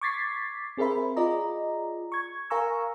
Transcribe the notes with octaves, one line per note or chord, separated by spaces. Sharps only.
C#6 D6 G#6 A6 B6 C7
C4 G#4 A#4 C5 E5 B5
F4 G#4 D5 D#5 A#5
C#6 G#6
A#4 F5 G#5 A#5 C#6 E6